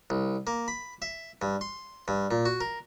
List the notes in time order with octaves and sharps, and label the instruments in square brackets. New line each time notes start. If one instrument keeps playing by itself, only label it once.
[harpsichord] C2
A#3
B5
E5
G2
C6
G2
A#2
F#4
A#4